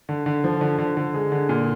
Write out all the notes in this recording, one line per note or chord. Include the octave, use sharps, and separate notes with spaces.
D3
D3
F3
D3
D3
D3
G#3
D3
A#2